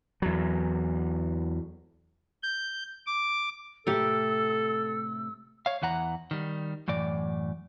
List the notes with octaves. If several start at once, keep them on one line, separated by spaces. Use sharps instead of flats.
E2 F#3
G6
D6
A2 C3 A3 G4 A4 A#4 E6
C#5 F5
E2 E3 F#5 A#5
D#3 G3
F#2 A2 E3 D5